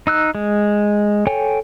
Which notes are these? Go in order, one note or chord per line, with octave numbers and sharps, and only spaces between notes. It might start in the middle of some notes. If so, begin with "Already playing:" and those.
D#4 E6 F#6
G#3
A4 C#5 G5 G#5